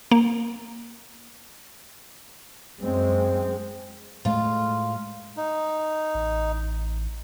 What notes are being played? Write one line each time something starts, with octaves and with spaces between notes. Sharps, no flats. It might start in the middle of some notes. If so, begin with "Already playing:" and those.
A#3
F#2 G#3 C4
A2 G#3 A3 F4
D#4
A1